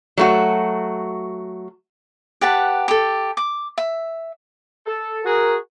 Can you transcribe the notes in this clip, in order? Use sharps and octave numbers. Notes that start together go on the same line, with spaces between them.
F#3 A3 F#4
G4 B4 F#5 A5
G4 A4
D6
E5
A4
F#4 G#4 A#4